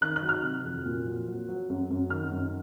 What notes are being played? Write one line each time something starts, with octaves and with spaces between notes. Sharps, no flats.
D#3 F#6
F#6
F#3
F6
C3
F2
A#2
F#3
F#3
F#3
F#2
F#2
D#3 F6
F#2